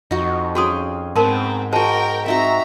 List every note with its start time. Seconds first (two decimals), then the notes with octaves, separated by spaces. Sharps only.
0.11 F2 D#4 F#4
0.55 C#4 F#4 G#4 G5 C6 D#6
1.16 G#2 B3 C4 A#4 B4 A5 C6
1.73 G#3 F#4 A#4 C5 G5 A5
2.26 C4 D#4 F#4 E5 A#5